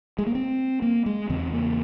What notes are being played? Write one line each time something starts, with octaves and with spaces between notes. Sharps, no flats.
G#3
A#3
C4
A#3
G#3
E2 C#3 C4
A#3